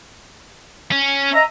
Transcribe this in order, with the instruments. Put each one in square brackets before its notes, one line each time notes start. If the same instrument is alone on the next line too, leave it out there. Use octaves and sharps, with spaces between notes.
[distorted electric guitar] C#4
[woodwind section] D#5 E5 A#5